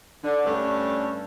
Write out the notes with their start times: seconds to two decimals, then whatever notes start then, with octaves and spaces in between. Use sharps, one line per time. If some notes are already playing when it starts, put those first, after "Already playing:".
0.24 D3
0.45 G2 A3 C#4 D4 A4